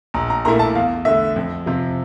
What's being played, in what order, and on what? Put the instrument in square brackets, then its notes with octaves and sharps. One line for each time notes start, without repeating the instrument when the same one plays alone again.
[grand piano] A#1 [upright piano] A#5
[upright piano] A#5
[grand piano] A#2 A3 E4 A#4 [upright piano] A#5
[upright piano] A5
[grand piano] E2 [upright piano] F5
[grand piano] D3 A3 [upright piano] E5
[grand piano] F2
C3 F3